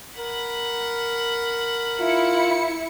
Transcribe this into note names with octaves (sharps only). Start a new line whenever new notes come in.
A#4 F#5 B5
E4 F4 C#7